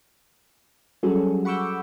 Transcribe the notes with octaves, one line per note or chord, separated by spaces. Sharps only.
F#3 G3 C#4 F#4 G#4 A4
F#5 B5 C#6 D6 E6 G6